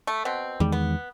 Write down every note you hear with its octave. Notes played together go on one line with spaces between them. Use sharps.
A3
B2 C4
E2 D#3 G3 G#3
B3